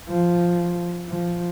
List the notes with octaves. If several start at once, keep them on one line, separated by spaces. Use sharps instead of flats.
F3
F3